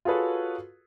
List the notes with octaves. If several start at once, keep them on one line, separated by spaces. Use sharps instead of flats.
F4 F#4 G#4 A4 B4 C#5